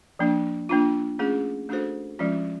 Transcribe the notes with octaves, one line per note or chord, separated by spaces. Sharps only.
F3 A#3 D4
A#3 D4 F4
A3 C#4 F4 G#4
A3 D4 F#4 A4 C5
F3 G#3 C#4 F4